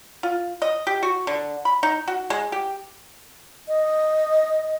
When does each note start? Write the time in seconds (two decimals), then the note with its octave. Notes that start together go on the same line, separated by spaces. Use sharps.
0.23 F4
0.62 D#5
0.87 G4
1.03 F#4
1.27 D3
1.65 B5
1.83 D#4
2.08 F#4
2.30 G#3
2.52 G4
3.68 D#5